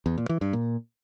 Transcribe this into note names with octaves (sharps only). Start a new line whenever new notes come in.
E2
A#2
E3
G2
A#2